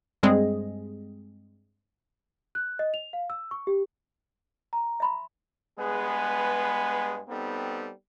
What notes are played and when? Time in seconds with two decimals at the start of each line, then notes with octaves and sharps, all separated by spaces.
0.23 G2 G3 G#3 C4 G#4 D#5
2.55 F#6
2.79 D#5
2.94 F7
3.13 F5
3.30 E6
3.51 C#6
3.67 G4
4.73 A#5
5.00 E5 B5 C6
5.78 G2 G#3 B3 G#4 B4
7.29 G3 B3 C4 D#4 A4